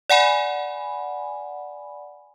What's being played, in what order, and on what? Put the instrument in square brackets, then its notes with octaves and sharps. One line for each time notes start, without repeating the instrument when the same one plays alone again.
[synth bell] D5 F#5 G#5 B5